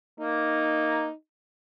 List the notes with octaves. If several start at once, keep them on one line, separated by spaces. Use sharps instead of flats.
A#3 D#4